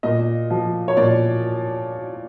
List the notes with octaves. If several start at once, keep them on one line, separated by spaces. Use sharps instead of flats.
A#2 D#5
F3
C#5
A#2 D5